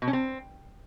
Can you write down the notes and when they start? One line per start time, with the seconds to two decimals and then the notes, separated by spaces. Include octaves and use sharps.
0.02 B2
0.08 C#4
0.13 C4